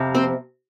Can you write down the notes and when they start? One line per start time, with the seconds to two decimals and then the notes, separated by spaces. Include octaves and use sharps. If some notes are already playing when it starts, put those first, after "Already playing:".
Already playing: F2 C3 F3
0.15 C4 C5